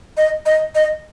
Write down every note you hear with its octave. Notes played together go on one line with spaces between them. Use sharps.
D#5
D#5
D#5